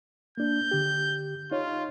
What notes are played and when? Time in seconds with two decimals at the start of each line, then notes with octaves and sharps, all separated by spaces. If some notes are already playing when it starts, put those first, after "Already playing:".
0.38 A#3 D4 G6
0.71 D3 G4
1.52 D#4 F4 C#5